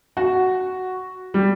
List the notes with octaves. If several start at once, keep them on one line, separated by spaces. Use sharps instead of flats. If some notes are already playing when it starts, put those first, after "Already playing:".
F#4
G3